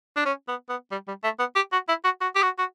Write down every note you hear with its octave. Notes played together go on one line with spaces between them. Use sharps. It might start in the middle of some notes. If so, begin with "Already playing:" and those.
D4
C#4
B3
B3
G3
G3
A3
B3
G4
F#4
E4
F#4
F#4
G4
F#4
F#4